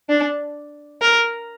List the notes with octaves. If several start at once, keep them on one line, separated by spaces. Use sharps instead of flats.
D4
A#4